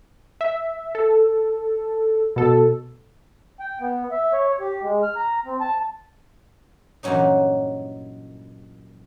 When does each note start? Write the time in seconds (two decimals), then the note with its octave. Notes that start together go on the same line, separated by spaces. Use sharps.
0.41 E5
0.95 A4
2.36 B2 A4
3.60 G5
3.80 B3
4.12 E5
4.33 C#5
4.60 G4
4.82 G#3
5.03 F6
5.16 A#5
5.45 C4
5.61 A5
7.03 G2 A#2 E3 F#3 C#4 D#4